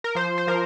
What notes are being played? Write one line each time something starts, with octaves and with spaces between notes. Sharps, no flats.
A#4
F3 C5
C5
F3 A#4